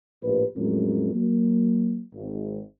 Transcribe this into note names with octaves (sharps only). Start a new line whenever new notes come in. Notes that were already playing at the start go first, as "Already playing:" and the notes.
A#1 A2 G4 B4
F2 A2 F#3 G#3 C#4 A#4
F#3 A#3
G#1